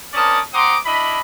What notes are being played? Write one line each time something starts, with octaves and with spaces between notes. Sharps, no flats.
C4 C#4 A#4 D5 A5 D#6
C4 F#5 A#5 C6 D6 D#6
D4 E4 D#5 B5